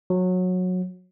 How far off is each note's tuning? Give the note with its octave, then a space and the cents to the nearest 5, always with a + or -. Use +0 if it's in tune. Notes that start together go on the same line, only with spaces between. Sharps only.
F#3 -20